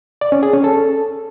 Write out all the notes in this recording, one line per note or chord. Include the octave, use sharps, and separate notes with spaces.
D5
C#4
G#4
C#4
A4